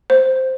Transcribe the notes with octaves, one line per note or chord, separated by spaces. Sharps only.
C5